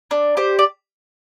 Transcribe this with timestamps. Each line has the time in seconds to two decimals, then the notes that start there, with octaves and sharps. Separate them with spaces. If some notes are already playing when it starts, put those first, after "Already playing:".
0.11 D4
0.37 G4 C5
0.59 D5